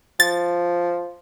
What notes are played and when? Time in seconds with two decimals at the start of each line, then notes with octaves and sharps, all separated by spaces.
0.20 F3 A6